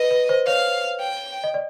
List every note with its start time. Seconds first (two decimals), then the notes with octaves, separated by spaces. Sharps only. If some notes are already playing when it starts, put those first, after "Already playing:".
Already playing: B4 D#5
0.11 B4
0.29 C5
0.47 C#5 F5
1.00 G5
1.44 D#5
1.54 D5